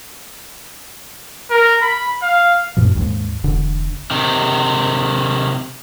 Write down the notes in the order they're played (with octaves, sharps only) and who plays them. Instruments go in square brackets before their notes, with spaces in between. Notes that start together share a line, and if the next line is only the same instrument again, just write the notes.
[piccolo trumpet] A#4
B5
F5
[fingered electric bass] F#2 A#2 F3
D#2 G#2
E1 D3
[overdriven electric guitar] C3 D#3